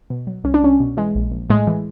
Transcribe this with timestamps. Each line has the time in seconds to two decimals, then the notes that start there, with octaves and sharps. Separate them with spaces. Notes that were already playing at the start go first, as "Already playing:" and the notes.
0.10 B2
0.27 F#3
0.44 C2 C#4
0.54 D4
0.62 C2 C#4
0.80 B2
0.97 E3 G#3
1.15 A#1
1.32 A#1
1.50 A2 G#3
1.67 E3